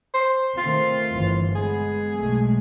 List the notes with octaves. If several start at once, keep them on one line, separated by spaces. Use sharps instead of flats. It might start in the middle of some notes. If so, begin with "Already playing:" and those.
C5
D#3 A3 C4 F4
G1 E3
G#3 B3 G#4
B1 G#3 A3